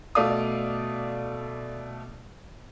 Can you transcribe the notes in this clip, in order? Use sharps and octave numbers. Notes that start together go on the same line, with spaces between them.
B2 A3 D5 F5 D#6